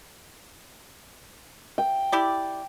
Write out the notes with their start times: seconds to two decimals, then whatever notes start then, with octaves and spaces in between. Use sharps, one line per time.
1.78 G5
2.12 E4 G4 D5